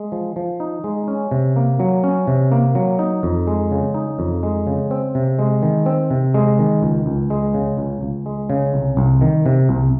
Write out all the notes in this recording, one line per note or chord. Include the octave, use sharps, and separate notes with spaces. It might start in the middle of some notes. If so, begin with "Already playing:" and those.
Already playing: G#3
F3
F3
D#4
G#3
C#4
C3
A#3
F#3
C#4
C3
A#3
F#3
D#4
F2
G#3
C#3
D#4
F2
G#3
C#3
C4
C3
G#3
D#3
C4
C3
G#3
D#3
C#2
C#2
G#3
C#3
C#2
C#2
G#3
C#3
C2
C2
D#3
C3
C2